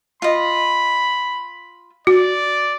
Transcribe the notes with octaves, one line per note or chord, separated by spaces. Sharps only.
F4 D#5 B5
F#4 D5